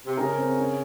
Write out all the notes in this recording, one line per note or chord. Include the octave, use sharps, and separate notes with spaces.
C3
C#3 A#4
C4
C#4